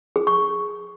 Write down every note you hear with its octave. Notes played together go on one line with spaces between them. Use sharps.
G#4
C#6